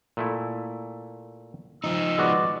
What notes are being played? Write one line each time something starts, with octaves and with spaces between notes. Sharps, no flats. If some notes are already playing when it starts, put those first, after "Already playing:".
A#2 A3 E4
F3 D#4 E6
G#3 B3 F#4 D5